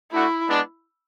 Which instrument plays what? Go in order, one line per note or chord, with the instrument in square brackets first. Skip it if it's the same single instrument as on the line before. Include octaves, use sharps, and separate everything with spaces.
[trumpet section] A3 D4 F#4 A4 [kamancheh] E4
[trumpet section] G#3 B3 D4